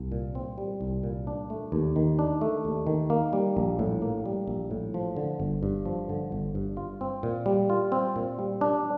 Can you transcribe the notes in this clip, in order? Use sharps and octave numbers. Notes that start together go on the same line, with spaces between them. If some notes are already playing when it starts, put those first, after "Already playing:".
Already playing: C2
A#2
C4
G3
C2
A#2
D4
A3
D#2
D#3
D4
A3
D#2
D#3
A#3
G3
A#1
A2
A#3
G3
A#1
A2
F3
D3
G1
G2
F3
D3
G1
G2
F4
C4
A#2
G3
F4
C4
A#2
G3
D4